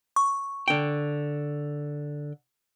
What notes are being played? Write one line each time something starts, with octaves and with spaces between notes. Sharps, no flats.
C#6
D3 G5